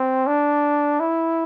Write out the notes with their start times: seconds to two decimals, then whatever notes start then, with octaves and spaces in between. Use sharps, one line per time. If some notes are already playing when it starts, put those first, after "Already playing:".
Already playing: C4
0.27 D4
1.00 E4